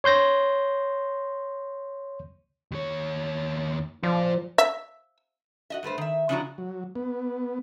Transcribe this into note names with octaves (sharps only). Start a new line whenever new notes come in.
C#5 C6 G6 A#6
D#2 C#5
F3 F4 D5
E5
F#4 D#5 E5
G2 A3 B4 C5
D#3 E5
C#3 F3 D4 E4 F#4 A#5
F#3
B3